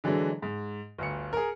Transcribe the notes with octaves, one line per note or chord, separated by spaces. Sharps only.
D3 E3 F#3 G#3 D4
G#2
G1 D2 C#7
G#4 A#4